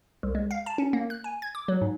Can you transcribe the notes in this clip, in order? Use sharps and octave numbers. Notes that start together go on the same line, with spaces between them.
C2
G#3
F5
A5
C#4
A#3
F#6
G#5
G#6
D6
F#3
G#2